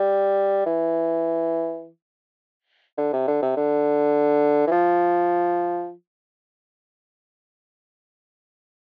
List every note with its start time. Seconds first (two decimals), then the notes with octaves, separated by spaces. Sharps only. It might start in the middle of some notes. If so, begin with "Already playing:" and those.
Already playing: G3
0.66 E3
2.98 D3
3.13 C3
3.28 D3
3.42 C3
3.57 D3
4.67 E3
4.72 F3